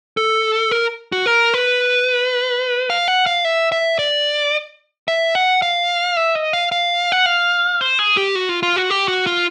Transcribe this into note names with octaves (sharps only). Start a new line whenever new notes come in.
A4
A#4
F#4
A#4
B4
F5
F#5
F5
E5
E5
D5
E5
F#5
F5
E5
D#5
F5
F5
F#5
F5
C5
G#4
G4
F#4
F4
F4
F#4
G4
F#4
F4